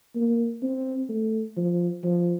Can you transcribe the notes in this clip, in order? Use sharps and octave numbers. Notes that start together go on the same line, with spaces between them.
A#3
C4
A3
F3
F3